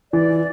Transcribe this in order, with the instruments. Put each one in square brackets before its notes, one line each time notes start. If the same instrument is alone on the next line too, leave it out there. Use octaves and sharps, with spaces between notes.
[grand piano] E3 [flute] D5